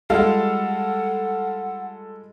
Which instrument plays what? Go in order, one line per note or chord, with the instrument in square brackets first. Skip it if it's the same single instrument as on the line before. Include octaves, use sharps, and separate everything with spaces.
[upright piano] G3 G#3 F4 [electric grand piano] A4 [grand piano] F5 [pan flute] F#5